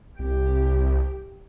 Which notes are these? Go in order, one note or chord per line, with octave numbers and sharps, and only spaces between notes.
C2 G4